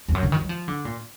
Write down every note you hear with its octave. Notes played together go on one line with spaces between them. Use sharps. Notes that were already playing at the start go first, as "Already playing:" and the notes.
F2
F#2
D3
D#3
F#3
F3
D3
A#2